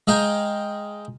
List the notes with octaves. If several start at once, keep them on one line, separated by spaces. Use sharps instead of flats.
G#3 G#4 F5 G5 A#5